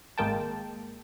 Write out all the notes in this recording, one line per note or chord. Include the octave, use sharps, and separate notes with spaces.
G#1 G#3 A#3 G5 A5